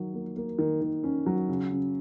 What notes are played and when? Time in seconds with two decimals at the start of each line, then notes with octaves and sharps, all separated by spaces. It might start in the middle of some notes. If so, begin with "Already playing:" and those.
Already playing: D#3 F#3
0.14 A#3
0.37 A#3
0.59 D#3
0.81 D#3
1.04 C#4
1.26 F#3
1.49 C#3
1.71 C#3